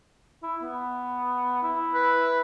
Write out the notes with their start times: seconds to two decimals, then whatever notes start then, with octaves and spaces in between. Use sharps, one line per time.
0.43 E4
0.62 B3
1.63 E4
1.94 B4